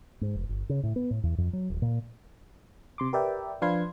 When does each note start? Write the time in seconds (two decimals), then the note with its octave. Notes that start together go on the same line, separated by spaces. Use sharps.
0.21 G#2
0.35 F1
0.49 G1
0.69 C#3
0.83 A2
0.96 B3
1.11 A2
1.23 E2
1.38 F2
1.53 F#3
1.70 D#1
1.82 A#2
2.98 C3 C6 D6
3.13 G4 A#4 B4 D5 E5 G5
3.62 F3 D4 B4 F5 C6 G#6